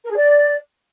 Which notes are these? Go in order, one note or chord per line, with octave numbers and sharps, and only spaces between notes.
A#4
G#4
D5